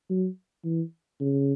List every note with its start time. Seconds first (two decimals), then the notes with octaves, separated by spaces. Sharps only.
0.10 F#3
0.64 E3
1.20 C#3